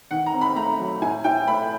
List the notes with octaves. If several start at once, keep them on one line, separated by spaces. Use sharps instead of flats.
D#3 F#5
A#5
C4
B5
A3 A#5
F#3
A2 G#5
A2 G5
A3 B5